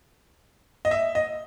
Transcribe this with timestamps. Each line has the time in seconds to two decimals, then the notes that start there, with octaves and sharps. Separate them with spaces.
0.85 D#5
0.91 E5
1.15 D#5